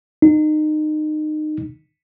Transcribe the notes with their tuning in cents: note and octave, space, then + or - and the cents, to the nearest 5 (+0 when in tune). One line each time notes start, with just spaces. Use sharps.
D#4 -25